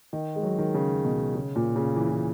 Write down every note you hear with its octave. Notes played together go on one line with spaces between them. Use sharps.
D#3
G#3
F#3
D#3
C#3
B2
C#3
A#2
C#3
E3
E3